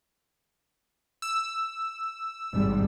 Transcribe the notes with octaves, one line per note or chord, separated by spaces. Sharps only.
E6
G#1 G3